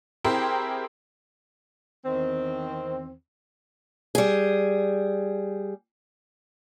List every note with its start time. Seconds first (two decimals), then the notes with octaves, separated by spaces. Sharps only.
0.24 C4 E4 G4 G#4 A#4 C5
2.05 E2 D#3 C4
4.15 G3 G#4